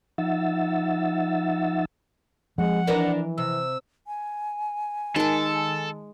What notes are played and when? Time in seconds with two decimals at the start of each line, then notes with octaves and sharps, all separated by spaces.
0.18 F3 D#4 E5 F#5 E6 A6
2.58 F3 G#3 C4 F#5
2.87 E3 D4 A#4 B4
3.38 C3 E6
4.07 G#5
5.16 D#3 G#3 A4 A5